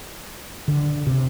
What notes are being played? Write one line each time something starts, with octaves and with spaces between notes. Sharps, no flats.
D3
C3